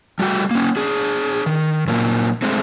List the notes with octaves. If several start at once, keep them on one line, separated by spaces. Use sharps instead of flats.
G3 A3 F#4 G5
A#3 C#4
D4 G#4
D#3
A#2 F#3 A#3
G#3 A3 C4